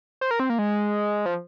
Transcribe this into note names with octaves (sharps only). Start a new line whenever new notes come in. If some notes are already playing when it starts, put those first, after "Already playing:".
C5
A#4
C4
A#3
G#3
F3